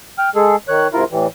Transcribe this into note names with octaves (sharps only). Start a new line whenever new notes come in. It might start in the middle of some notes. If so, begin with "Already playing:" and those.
G5 F6
G#3 G#4 A4
D#3 C#5 F#6
G#2 C3 E4 F4 A#4
A2 E3 G3